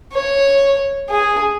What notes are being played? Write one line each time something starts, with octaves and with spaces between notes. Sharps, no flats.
C#5
G#4